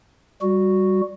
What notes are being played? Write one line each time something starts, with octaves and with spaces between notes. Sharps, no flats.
G3 F#4